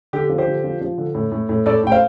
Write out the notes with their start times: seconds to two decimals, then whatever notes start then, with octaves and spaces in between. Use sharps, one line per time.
0.13 D3 G4
0.29 F3
0.38 G4 C5
0.47 D3
0.64 F3
0.81 F3
0.98 D3
1.15 A2
1.32 A2
1.49 A2
1.66 A2 A4 D5
1.83 A2 G5
1.92 C5 F5